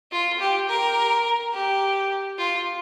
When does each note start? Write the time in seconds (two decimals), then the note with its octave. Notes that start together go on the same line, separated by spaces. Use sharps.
0.11 F4
0.39 G4
0.68 A#4
1.53 G4
2.38 F4